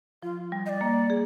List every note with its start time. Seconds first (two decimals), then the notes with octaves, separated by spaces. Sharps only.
0.23 F3 F4
0.52 G3
0.66 D#5
0.69 D5
0.81 A#3
1.10 G#4